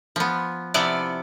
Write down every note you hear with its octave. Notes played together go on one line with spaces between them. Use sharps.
F3 B3
C3 F3 B3 E4 D5